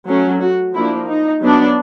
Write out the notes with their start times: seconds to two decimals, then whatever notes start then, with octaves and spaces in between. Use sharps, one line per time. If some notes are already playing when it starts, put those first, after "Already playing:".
0.08 F#3 A3 C#4
0.41 F#4
0.74 F3 A#3 D4 E4
1.08 D#4
1.42 F#3 B3 D4